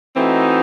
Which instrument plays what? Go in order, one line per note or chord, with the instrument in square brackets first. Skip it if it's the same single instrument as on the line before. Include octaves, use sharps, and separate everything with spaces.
[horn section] E3 A3 C4 D#4 F#4